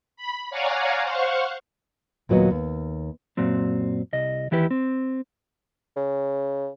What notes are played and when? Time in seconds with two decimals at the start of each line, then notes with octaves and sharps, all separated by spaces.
0.17 B5
0.50 C#5 D5 F5 F#5 G#5 A#5
1.03 C5 F5 F#5 C#6
2.29 D#2 A#2 F#3 B3 D#5
2.51 D#2
3.37 F#2 A#2 F#3 C4
4.13 C2 D#5
4.51 D#2 E3 E4 G4 B4
4.71 C4
5.97 C#3